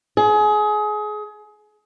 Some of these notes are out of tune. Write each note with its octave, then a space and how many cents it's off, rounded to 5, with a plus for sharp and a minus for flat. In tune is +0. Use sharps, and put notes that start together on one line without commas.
G#4 +25